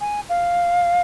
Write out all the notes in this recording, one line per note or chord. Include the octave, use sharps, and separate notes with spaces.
G#5
F5